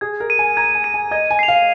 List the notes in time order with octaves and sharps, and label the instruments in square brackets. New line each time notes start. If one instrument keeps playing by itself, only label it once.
[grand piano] G#4 [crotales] G#6
[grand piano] A#4
[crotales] D#7
[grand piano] G#5
[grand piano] A#5 [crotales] G#6
[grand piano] G#5
[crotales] D#7
[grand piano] G#5
[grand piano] D#5 [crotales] G#6
[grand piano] G#5
[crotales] C7 F7
[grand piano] F5